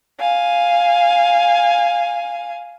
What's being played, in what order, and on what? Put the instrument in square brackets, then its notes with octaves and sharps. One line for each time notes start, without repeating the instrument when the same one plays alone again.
[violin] F5 G#5